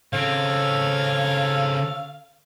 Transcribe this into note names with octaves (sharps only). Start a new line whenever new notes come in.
C#3 C4 A4 C#5 F5